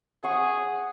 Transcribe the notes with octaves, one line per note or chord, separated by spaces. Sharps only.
G#4 F#5 C#6